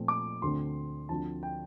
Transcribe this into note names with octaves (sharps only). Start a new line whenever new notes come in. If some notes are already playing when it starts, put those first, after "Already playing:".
Already playing: A#2 F3 A3 C4
D6
D2 D3 A3 C4 C6
D2 D3 F3 C4 A5
G5